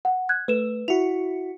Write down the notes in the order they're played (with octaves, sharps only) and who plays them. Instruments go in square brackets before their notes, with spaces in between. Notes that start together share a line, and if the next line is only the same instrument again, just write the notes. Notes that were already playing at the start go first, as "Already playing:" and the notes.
[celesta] F#5
F#6 G#6
[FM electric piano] A3 [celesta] B4 E7
[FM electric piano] E4 F#4 [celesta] F7